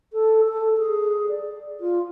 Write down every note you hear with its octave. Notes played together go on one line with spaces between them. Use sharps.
A4
A4
G#4
D5
F4